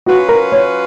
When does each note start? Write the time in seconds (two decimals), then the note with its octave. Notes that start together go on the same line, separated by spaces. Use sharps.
0.06 F#3 C#4 F4 F#4 B4
0.29 A#4
0.52 C#5